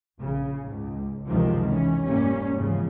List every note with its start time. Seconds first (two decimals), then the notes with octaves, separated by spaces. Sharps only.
0.19 A#1 C#3
0.67 C#2 G#2
1.28 C#2 F#2 C3 D#3 F3 G#3
1.66 E3 C#4
2.06 F1 G#2 G3 A#3 C#4
2.56 E2 G#2 C#3 F3